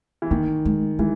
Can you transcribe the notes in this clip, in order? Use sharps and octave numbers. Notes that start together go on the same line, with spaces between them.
E3
D#3 A#3
G#3
E3 G#3